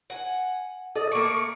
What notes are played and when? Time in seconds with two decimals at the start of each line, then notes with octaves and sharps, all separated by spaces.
0.10 F#5 G#5
0.95 A4 D5 D#5
1.12 A3 A#3 C#6 D6